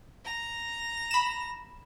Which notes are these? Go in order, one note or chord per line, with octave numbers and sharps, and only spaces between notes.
A#5
B5 E7